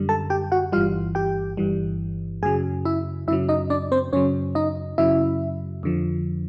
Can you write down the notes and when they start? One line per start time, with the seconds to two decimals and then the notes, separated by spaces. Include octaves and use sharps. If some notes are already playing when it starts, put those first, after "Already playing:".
Already playing: F#2 D3 G3
0.09 A4 A5
0.30 G4 G5
0.52 F#4 F#5
0.72 G1 G2 E3 G3 F4 F5
1.15 G4 G5
1.57 G1 G2 E3 G3
2.43 F#2 C#3 F#3 G#4 G#5
2.85 E4 E5
3.28 F#2 C#3 F#3 E4 E5
3.49 D#4 D#5
3.70 D4 D5
3.92 C4 C5
4.13 F#2 C#3 F#3 C#4 C#5
4.55 D#4 D#5
4.98 F#2 C#3 F#3 E4 E5
5.83 F2 D3 F3